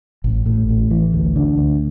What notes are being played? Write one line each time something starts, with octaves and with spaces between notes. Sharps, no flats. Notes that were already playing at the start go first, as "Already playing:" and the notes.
A1
A2
A1
E3
D2
D3
D2